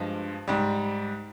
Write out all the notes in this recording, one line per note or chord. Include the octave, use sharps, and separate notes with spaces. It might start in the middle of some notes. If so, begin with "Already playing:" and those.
Already playing: G2 F3 G#3
G#2 G3